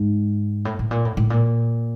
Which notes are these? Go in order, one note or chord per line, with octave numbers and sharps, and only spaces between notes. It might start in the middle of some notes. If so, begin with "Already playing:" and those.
Already playing: G#2
A2
A2
A#2
A2
A2
A#2